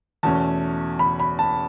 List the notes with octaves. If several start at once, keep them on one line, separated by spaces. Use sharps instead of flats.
E2 B2 A3 C#4 A5
B5
B5
A5